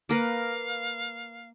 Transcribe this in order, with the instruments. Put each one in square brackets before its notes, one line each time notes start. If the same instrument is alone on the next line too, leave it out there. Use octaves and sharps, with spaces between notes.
[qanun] A#3 A#4 B4 [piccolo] F5